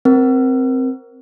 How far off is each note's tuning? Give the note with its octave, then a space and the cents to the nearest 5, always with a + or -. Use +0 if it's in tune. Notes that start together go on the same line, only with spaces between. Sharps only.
C4 +0 A#4 +15